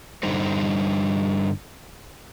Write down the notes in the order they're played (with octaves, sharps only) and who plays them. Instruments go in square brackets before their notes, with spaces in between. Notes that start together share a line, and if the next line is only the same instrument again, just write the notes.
[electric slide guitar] G2 D3 G3 D#4 C5